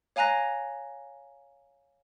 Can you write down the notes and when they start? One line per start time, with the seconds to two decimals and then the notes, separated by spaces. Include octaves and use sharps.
0.16 C#5 F5 G#5 A#5 F#6 A#6